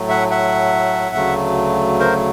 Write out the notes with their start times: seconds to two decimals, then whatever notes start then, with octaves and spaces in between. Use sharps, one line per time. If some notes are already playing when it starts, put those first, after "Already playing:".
Already playing: A2 F#3 A3
0.09 E5 F#5
0.30 E5 F#5
1.15 D2 C#3 F#3 A3
1.99 A#4 C5